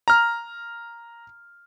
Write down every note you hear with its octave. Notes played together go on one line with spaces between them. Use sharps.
A#5 F6